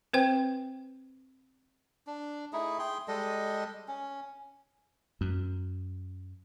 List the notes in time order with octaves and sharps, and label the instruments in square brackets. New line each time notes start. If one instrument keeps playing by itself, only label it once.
[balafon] C4 B4 C5 G5
[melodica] D4
A3 D#4 E4 G#4
G#4 G5 C6
G3 G#3 A4 D#5
C#4
[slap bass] F#2